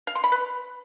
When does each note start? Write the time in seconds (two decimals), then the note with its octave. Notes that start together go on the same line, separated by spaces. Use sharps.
0.07 F5
0.15 C6
0.24 B5
0.32 B4